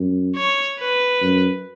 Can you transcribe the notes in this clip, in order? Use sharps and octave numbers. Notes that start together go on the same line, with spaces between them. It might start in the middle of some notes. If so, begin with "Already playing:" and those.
Already playing: F#2
C#5
B4
F#2